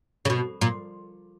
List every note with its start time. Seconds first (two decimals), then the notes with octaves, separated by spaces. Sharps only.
0.25 C#3
0.30 B2
0.61 A#2